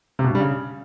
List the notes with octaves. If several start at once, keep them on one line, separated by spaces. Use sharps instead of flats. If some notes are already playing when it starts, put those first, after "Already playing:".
C3
B2
G2
G3
C#3